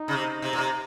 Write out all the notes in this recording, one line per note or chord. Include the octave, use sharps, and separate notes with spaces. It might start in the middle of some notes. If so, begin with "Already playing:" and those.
Already playing: D#4
C#3
C3
C3
A#2
C3